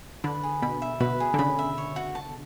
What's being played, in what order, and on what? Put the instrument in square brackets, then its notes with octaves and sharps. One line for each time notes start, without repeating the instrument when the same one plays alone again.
[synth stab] D3 [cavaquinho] B4
[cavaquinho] G#4
[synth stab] B2 [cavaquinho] B5
[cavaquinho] E5
[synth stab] B2 [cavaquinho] B4
[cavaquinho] G#4
[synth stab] D3
[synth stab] C#3 [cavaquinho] B5
[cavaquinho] E5
C#5
F#4
A5